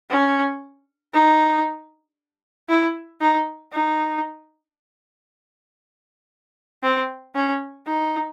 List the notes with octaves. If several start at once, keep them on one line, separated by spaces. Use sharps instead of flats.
C#4
D#4
E4
D#4
D#4
C4
C#4
D#4